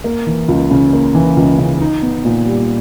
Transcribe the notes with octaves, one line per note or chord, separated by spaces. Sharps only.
A#3
E3
C#2
C#3
A#3
E3
C#2
C#3
D#4
B3
A#2
G3